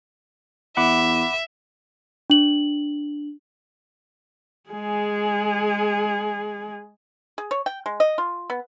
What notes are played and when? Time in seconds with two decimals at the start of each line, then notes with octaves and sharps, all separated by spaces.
0.77 E2 E5 F#5 B5 D6
2.30 D4 F#7
4.70 G#3 G#4
7.38 G#4
7.51 C#5
7.66 G5
7.86 G#3
8.00 D#5
8.18 F4
8.50 B3